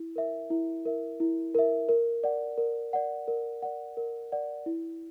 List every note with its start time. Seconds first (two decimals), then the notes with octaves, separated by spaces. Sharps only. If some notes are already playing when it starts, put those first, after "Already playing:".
Already playing: E4
0.16 A#4 E5
0.50 E4
0.85 A#4 E5
1.20 E4
1.55 A#4 E5
1.89 A#4
2.24 D5 F#5
2.58 A#4
2.93 D5 F#5
3.28 A#4
3.63 D5 F#5
3.97 A#4
4.32 D5 F#5
4.66 E4